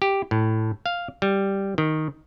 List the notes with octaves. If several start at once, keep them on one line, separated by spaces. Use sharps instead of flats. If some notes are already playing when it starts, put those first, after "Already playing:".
G4
A2
F5
G3
D#3